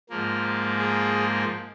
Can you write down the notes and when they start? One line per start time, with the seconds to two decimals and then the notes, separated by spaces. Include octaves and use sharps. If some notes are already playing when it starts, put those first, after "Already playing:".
0.09 G#2 F3 A#3
0.77 G#4